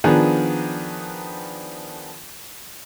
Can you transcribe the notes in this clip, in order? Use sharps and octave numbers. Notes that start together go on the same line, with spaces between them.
D#3 F3 B3 D4 G#4